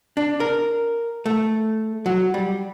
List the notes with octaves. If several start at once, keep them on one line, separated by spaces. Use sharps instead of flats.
D4
A#4
A3
F#3
G3